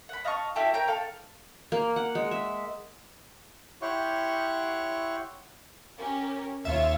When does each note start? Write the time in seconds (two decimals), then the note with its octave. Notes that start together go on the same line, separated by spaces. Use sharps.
0.09 F#5 B5
0.25 D#5 F5 A5 C#6
0.56 E4 F#4 G4 A4
0.74 A#4 C#5 G5 A#5
0.88 A4 F5
1.72 A#3
1.96 F#5
2.15 G#3
2.31 E5
3.82 E4 G4 C#5 F#5 C6 C#6
5.99 C#4 G4 A#4
6.65 D#2 F4 C#5 E5 F5